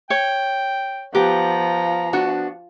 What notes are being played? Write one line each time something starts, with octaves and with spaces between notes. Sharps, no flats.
C#5 G5
F3 B3 G4 A#5
B3 D4 F#4